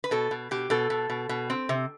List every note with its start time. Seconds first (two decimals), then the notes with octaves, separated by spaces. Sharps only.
0.04 B4
0.11 B2 A4
0.31 B2
0.51 B2 G4
0.70 B2 A4
0.90 B2
1.10 B2
1.29 B2
1.50 C4
1.69 C3